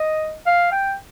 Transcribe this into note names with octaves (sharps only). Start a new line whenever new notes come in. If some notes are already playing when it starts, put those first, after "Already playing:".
Already playing: D#5
F5
G5